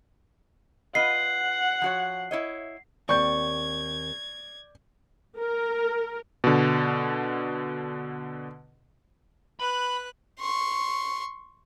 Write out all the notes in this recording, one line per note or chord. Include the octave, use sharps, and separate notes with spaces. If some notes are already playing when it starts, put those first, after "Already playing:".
F4 B4 D#5 F#5 C7
F3 F#4 C#5
E4 C#5 D#5
D#2 C4 D5 C#6 G6 G#6
A#4
B2 D3
B4 B5 F#6
C6 C#6